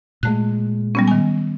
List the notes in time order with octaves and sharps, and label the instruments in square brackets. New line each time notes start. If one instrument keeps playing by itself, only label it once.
[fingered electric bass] A#2 G#3 [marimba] A3 F#6
[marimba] G3 B3 C#4
D#3 G#5